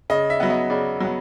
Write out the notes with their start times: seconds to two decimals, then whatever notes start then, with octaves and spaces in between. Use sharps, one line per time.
0.10 C#3 D#5
0.30 E5
0.40 F#3 B3
0.50 D#5
0.70 C#3 D5
1.00 F#3 B3